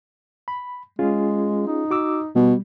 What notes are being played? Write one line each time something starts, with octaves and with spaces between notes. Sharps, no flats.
B5
G#3 C#4 F4 G#4
D#4
F#4 D6 E6
B2 G3